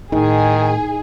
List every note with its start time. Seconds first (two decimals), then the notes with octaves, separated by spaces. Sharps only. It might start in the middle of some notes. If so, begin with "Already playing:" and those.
0.12 A2 D#3 D#4 G#4